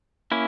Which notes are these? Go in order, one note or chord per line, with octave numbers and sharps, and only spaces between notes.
A#3 C#4 E4